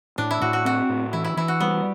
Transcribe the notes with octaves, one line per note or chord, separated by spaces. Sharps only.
A2 D4
E4
A2 F#4
F#4
C4 F#4
A2
E3 E4
E4
E3 E4
F#4
G3 B3